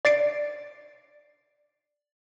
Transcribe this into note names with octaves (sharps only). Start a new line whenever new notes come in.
D5 A6 C7 D7